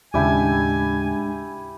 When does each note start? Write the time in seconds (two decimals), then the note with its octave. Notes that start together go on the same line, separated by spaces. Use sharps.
0.14 D#2 A2 C#3 G#3 D4 E4 G4 G#5